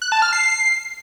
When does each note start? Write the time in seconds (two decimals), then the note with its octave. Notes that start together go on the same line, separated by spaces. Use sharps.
0.02 F#6
0.12 A5
0.22 F6
0.33 C7